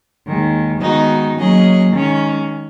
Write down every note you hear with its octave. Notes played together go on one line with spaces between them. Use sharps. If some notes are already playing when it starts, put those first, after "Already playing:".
D#2 D#3 G#3
D#3 G#3 B3 D#4 F#4
F#3 A#3 C#4 G#4 D#5
D#3 G#3 C#4